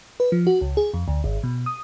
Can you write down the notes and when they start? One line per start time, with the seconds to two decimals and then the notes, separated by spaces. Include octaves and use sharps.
0.20 B4
0.32 F3
0.47 F#4
0.61 C#2
0.77 G#4
0.94 F2
1.08 D2
1.24 G#1
1.43 B2
1.66 D#6